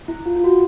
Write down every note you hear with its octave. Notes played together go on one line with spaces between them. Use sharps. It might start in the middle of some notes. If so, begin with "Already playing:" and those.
E4
F4
F4
F#4